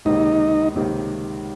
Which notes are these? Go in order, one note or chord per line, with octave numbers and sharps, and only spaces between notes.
C#2 C3 D#3 A#3 D#4
C#2 C3 D#3 A#3